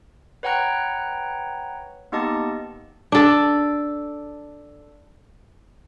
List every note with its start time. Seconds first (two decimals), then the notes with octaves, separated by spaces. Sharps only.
0.43 B4 C#5 F#5 G5 A#5 F#6
2.12 A#3 B3 D#4 G4 D#5 A5
3.12 D4 A4